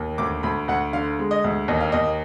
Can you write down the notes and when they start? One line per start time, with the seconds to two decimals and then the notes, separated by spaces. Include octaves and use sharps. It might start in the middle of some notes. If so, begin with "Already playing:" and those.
Already playing: D#2
0.18 D2 D6
0.43 D2 B5
0.68 D2 F#5
0.93 D3 F5
1.19 G#3
1.31 D#5
1.44 D2
1.68 D#2 D#5
1.81 F5
1.92 D#2 D#5